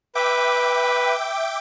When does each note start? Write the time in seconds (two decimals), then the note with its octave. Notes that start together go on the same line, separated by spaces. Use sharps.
0.15 B4 E5 G5 D6